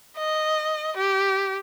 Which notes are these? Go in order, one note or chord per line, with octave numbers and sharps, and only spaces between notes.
D#5
G4